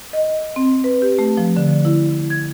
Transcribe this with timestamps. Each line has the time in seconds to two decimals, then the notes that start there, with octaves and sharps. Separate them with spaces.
0.13 D#5
0.56 C4
0.84 B4
1.02 G4
1.19 A3
1.38 F3
1.57 D3
1.85 E4
2.30 G#6